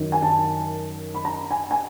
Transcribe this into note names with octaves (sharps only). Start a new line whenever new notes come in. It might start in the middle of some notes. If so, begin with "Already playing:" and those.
Already playing: F#2 D#3 F#3
G#5
A5
B5
A#5
G#5
G#5